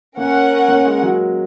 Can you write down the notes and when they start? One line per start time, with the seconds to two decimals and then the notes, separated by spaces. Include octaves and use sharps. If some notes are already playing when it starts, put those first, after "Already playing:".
0.16 A#3 C#4 A#4 F#5
0.68 A#3
0.85 G#3
1.03 F#3